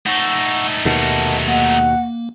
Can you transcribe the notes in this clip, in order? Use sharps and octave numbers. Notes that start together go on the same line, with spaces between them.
A3 D#4 F#5 C#6 E6
D#2 B2 A#4 F#5 A5
A#3 F#5